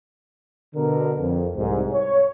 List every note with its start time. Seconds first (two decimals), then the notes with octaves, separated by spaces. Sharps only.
0.75 B2 D3 A#4
1.19 F2
1.56 C2 G#2
1.93 C#5